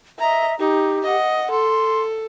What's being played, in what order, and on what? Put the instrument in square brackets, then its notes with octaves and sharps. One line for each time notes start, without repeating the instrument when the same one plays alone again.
[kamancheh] D#5 A#5 [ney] E5
[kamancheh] D#4 [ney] G4
[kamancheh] D#5 F#5
[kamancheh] A4 [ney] C6